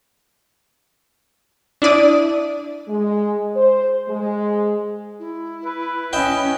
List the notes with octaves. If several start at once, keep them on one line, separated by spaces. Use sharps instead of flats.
D4 E4 D5 D#6
G#3
C5
G#3
E4
B4
C#4 D#5 E5 G5